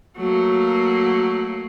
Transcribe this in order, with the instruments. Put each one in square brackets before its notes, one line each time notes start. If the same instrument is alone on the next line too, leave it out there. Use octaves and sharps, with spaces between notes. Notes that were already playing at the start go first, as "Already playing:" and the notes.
[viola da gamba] F#3 A3 A#3